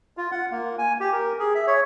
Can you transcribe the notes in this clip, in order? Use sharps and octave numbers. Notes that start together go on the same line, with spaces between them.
F4
F#5
A#3
G#5
G4
A#4
G#4
E5
C#5